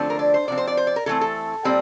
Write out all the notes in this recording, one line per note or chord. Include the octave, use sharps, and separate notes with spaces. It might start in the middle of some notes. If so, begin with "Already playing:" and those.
Already playing: D3 F3 A3 C4
A#4
D5
C5
C3 F3 C4 D5
C5
D5
C5
D5
A#4
E3 A3 C4 A4
A4
A#2 G3 C4